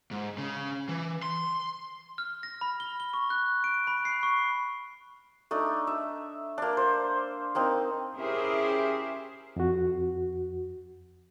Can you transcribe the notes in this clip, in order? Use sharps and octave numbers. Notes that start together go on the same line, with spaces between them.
G#2
C#3
E3
C6
F6
A#6
B5
G7
G7
C#6
F#6
D7
B5
C7
C#6
A3 D4 D#4
E5
A#3 D4
C5
A#3 C4 D#4
C#4 E4 G4 G#4 A#4 C5
F2 F#4